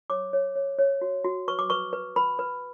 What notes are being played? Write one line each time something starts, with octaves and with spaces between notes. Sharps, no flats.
C#5 D6
C#5
C#5
C#5
F#4
F#4
B4 C#6
D6
B4 C#6
B4
B4 B5
B4